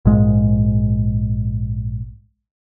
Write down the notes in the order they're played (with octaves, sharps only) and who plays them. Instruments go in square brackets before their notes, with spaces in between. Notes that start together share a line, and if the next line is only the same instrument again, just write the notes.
[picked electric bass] A#1 G#2 G#3